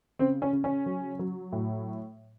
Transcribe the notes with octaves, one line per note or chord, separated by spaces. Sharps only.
C#3 C4
C#4
C#3
C#4
F#3
F#3
A2